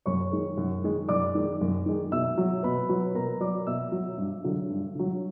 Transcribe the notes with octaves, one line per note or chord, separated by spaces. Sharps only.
F#2 C#5 C#6
D#3 G#3
F#2
D#3 G#3
F#2 D5 D6
D#3 G#3
F#2
D#3 G#3
B2 E5 E6
F#3
B2 B4 B5
F#3
B2 A#4 A#5
F#3 D5 D6
B2 E5 E6
F#3
G2
D3 F#3
G2
D3 F#3